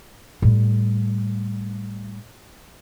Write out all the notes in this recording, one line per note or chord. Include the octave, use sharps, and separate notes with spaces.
A2 G3